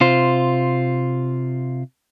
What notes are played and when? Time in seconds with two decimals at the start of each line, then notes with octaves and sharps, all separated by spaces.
0.01 C3 F4 C5